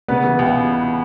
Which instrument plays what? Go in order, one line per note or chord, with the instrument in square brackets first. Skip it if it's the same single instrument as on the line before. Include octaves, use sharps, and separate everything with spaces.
[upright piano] C#3 [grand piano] B3 B4
[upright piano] E3
C#2